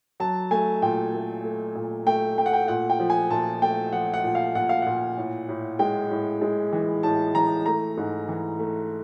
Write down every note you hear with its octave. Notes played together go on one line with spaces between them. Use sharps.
F#3 A5
A3 G#5
A#2 G5
A3
A3
A#2
A3 G5
A3 G5
F#5
G5
A#2 F#5
G5
F3
G#5
A#2 A5
A3 G5
F3 F#5
F#5
A#2
F5
A#2 F#5
F5
A#2 F#5
A2
A2
G#3 G5
A2
G#3
E3
A2 A5
E3 A#5
A3 A#5
G#2
E3
A3